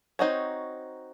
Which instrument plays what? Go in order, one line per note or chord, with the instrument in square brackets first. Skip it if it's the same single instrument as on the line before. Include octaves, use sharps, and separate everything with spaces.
[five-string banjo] C4 D#4 F#4 C#5